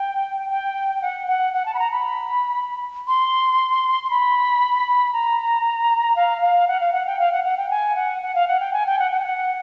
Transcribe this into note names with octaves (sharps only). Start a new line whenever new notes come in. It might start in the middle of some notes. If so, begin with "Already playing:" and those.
Already playing: G5
G5
G5
F#5
F#5
F#5
A5
B5
A#5
B5
C6
C6
B5
A#5
F5
F5
F#5
F5
F#5
G5
F5
F#5
F#5
G5
G#5
F#5
F#5
F5
F#5
G5
G#5
G5
F#5
F#5
G5
F#5